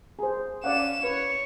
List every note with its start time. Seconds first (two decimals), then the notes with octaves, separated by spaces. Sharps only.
0.19 G#4 C5
0.64 C#4 D5 F5 F#5 E7
1.03 B4 C#5